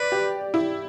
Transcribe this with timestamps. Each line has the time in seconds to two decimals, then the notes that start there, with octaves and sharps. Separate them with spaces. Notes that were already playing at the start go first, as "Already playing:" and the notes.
Already playing: B4 D5
0.12 G4
0.54 E4